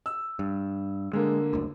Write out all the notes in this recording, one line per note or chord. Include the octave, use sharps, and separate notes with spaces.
E6
G2
D3 G#3 A#3
F#1 D2